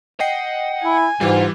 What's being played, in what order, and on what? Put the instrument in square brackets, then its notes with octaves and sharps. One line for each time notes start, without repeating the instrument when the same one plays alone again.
[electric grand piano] D#5 G5 C7 [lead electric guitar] F#5
[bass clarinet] E4 [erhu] G#5
[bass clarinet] G#2 [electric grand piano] E3 G3 [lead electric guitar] F4